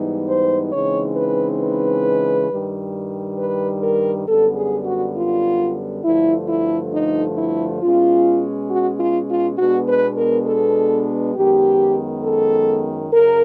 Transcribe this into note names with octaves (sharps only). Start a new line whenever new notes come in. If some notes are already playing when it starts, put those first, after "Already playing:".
Already playing: G#2 E3 G3 B3 D#4
C5
C#3 E3 G#3 C4 D#4 C#5
B4
B4
G2 D#3 G3
B4
A#4
F#2 D3 G3 B3 A4
G#4
F#4
F4
G2 D3 F3 A3 E4
E4
D#4
E4
B2 G#3 C#4 F4
F#4
F4
F4
B2 G#3 B3 D4 F#4
B4
A#4
A4
F#2 D#3 G#3 B3 G4
A4
F#2 C#3 A#4